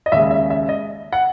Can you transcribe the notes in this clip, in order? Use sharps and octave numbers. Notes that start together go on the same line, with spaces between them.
D#5
D#2 C#3 G#3 E5
E5
E5
D#5
F#5